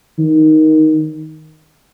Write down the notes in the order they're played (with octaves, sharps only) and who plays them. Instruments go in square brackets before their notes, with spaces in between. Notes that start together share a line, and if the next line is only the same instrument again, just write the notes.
[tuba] D#3